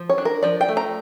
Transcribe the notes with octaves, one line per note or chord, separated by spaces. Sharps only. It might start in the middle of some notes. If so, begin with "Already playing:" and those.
Already playing: F3
C#5
D4
A#4
F3 D5
G5
A3
A#5